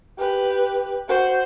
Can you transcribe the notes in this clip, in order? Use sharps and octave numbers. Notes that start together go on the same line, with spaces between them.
G4 B4
F#4 C5